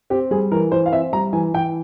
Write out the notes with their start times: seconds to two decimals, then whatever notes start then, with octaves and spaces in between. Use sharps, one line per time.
0.10 C4 G4
0.31 G3 G#4
0.52 E3 A#4
0.72 E3 C5
0.86 F5
0.92 C4 E5
1.13 G3 A#5
1.33 E3 G#5
1.54 E3 G5